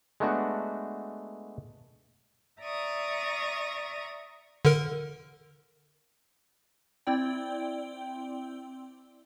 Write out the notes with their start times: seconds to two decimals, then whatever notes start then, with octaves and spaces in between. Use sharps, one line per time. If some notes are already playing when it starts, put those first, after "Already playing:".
0.20 G#3 A3 B3 D4 F#4
2.61 D5 E5 A#5 C#6 D#6
4.65 D3 A#4
7.07 C4 E4 D5 G5